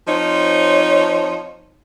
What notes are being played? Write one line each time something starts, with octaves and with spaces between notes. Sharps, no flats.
F3 C4 D#4 C#5